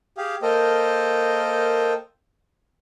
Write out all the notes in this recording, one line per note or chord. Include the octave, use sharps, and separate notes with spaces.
G4 G#4 F5
A#3 A4 A#4 C5 D#5 G5